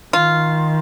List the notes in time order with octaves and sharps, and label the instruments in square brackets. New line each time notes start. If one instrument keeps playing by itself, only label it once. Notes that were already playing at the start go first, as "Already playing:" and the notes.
[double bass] D#3 [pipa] F4